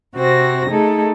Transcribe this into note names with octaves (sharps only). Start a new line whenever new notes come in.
C3 C4 F#4 C5 A#6
A3 D#4 G#4 A4